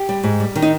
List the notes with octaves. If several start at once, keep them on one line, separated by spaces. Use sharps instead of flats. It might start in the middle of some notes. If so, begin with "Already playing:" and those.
Already playing: G4
G3
G#2
G3
D#3
D#4